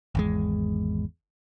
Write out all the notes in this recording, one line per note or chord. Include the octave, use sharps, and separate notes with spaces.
G#1 E2 G#3